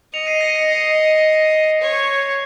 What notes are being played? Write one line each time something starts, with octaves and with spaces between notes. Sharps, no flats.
D#5 C#7 F7
C7 D#7
D#5 A#6 C#7
A#6 C#7
D#5 C7
C#5